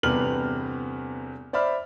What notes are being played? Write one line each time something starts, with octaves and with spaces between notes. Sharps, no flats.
G1 E2 C3 B4 F6 F#7
C5 D5 E5 B5 F6